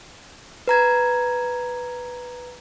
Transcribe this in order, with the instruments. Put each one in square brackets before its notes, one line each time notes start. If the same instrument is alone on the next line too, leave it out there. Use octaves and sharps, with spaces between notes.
[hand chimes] B4 A#5 G#6